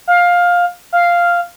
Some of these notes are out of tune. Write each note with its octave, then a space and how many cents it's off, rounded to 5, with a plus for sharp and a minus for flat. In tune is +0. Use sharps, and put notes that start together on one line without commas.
F5 +15
F5 -5